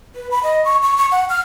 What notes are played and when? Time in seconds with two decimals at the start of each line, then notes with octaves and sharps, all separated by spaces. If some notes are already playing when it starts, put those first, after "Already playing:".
0.15 B4
0.31 B5
0.43 D#5
0.65 C#6
0.82 C#6
0.97 C#6
1.11 F#5
1.29 F6